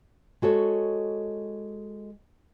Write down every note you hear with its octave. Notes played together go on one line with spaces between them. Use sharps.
G#3 F#4 A4 C#5